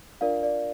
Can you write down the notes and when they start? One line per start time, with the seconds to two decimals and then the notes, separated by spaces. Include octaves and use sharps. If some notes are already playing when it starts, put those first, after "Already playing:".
0.21 D4 F4 A#4 D5 F5
0.43 D5